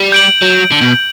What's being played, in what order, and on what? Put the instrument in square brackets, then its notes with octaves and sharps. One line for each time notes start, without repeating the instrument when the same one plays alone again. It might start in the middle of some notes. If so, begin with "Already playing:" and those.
Already playing: [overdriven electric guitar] G3
[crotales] G6 D7 F#7
[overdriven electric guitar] F#3
D3
B2